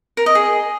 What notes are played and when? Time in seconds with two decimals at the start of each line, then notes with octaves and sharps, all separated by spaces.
0.17 A#4
0.26 D#5
0.35 G#4